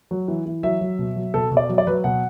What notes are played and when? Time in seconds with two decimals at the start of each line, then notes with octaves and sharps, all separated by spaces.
0.11 F#3
0.28 E3
0.46 E3
0.63 F#3 E5
0.81 F#3
0.99 B2
1.16 F#3
1.34 B2 A4
1.51 B2
1.57 D5
1.69 F#3
1.78 D5
1.87 F#3 B4
2.04 B2 F#5